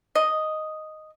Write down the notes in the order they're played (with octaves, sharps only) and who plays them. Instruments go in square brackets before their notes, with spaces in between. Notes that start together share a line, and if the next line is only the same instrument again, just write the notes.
[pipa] D#5